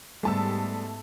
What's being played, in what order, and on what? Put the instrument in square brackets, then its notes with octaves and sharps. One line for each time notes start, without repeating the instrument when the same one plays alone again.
[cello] G#2 B3 [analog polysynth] G3 [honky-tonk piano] A3 A5 E6